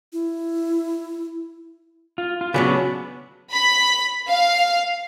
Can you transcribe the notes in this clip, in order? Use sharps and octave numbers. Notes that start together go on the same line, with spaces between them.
E4
F4
F4
C#3 F#3 B3 C#4 D4 B4
B5
F5